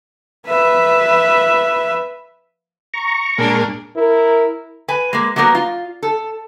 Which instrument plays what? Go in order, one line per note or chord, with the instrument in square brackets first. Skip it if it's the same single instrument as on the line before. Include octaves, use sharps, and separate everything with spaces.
[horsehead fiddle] B4 E5
[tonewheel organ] A#5 C#6
[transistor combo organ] A#2 G#3 A#3 [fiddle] D4 [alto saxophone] A#4
[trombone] E4 [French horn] A#4
[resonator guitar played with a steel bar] B4 G#5
G#3 A#3
F#3 G3 A#3 B3 A#4
F4
A4